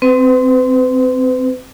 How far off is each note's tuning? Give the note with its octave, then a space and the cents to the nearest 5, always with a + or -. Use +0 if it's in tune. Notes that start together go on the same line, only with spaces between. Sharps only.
C4 -10 B4 +40